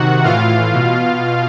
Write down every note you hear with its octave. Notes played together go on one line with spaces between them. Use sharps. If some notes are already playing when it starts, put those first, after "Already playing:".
Already playing: C3 D#3 F#4 F#5
A2 E3 F4 F5
B2